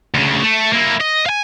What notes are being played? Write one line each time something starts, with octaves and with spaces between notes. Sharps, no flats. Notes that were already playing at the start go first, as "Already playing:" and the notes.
D2 C#3
A3
A#3 E4
D#5
F5 G#5